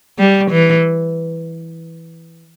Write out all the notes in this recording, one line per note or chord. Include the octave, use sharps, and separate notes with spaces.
G3
E3